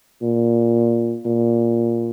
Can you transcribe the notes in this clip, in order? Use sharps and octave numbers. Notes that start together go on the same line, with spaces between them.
A#2
A#2